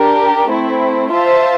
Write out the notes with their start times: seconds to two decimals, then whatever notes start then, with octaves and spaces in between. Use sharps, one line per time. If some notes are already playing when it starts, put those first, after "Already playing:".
Already playing: D4 G4 A#4
0.50 A3 C4 E4
1.11 F4 C5 E5 A5